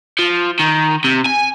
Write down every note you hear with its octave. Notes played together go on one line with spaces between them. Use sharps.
F3
D#3
C3
G#5